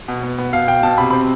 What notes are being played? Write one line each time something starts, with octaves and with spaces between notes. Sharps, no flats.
B2
B3
B3
B2 F5
B2 G5
B2 A5
C3 B5
C4 B5